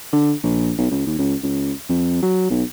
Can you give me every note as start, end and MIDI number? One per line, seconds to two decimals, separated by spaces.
0.12 0.32 50
0.43 0.72 34
0.78 0.88 35
0.91 1.04 37
1.06 1.14 39
1.18 1.35 37
1.42 1.72 37
1.89 2.22 41
2.22 2.49 54
2.50 2.63 35